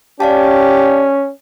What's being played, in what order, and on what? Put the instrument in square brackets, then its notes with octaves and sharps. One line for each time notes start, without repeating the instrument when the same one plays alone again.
[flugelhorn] C#4 [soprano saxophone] G4 [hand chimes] D5 F5 A5